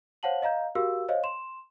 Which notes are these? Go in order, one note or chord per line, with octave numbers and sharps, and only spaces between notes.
C5 C#5 F5 F#5 A5 F#7
D#5 F5 A#5 G6
F#4 G4 A#4 F5 E6
C5 C#5 D#5 F5
C6 E7